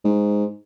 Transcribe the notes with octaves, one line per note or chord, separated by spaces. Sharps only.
G#2